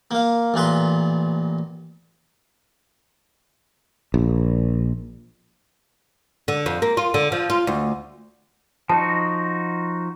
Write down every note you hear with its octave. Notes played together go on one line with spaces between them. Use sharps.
A#3 F5
A1 A#2 B4 C6
A#1
D3
F2
A#3
F4
D3
F3
F4
D2
F3 D#4 F#4 A5